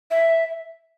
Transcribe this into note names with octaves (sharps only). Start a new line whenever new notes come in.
E5